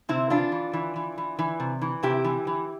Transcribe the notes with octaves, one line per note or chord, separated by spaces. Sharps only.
C3 C4 E4
E3 D4 F4
E3
E3
E3
E3
E3
C3
E3
C3 E4 G4
E3
E3